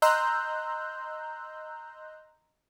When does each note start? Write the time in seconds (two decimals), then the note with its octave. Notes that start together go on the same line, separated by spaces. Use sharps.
0.02 D#5 A#5 C6 E6 F#6 G6